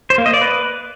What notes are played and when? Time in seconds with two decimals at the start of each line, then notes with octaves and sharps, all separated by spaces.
0.10 C5
0.18 A#3
0.26 D#5
0.34 D5
0.41 B4